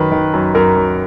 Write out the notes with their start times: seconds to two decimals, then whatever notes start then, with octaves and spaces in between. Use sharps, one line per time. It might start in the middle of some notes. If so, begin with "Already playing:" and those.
Already playing: F#2 D#3 B4
0.12 D#3
0.33 F#2
0.55 F#2 A#4
0.76 F#2